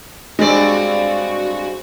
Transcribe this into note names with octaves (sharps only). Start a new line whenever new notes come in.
G2 G#3 C4 F#4 D5